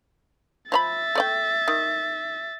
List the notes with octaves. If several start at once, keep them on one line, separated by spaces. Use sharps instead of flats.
F3 C#5 E5 B5 A6
A3 D5 G5
D#3